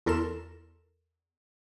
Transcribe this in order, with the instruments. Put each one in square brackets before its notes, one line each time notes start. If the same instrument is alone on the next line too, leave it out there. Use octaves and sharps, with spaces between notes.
[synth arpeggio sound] E2 A4 A#4 C6 E7